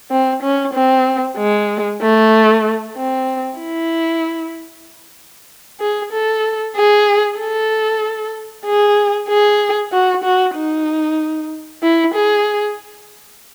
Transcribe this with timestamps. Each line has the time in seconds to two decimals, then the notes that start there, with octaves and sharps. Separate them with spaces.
0.11 C4
0.43 C#4
0.74 C4
1.37 G#3
2.01 A3
2.96 C4
3.59 E4
5.80 G#4
6.12 A4
6.76 G#4
7.39 A4
8.66 G#4
9.28 G#4
9.92 F#4
10.24 F#4
10.56 D#4
11.82 E4
12.14 G#4